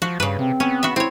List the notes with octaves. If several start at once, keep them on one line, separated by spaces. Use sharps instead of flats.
F3 F#4
G2 C#3 B4
C3 C4
B3 C#4
F#4 E5
C4 E4 C#5